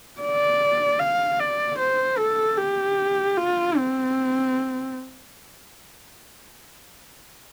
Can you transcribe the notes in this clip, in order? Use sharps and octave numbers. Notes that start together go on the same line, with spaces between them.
D5
F5
D5
C5
A4
G4
F4
C4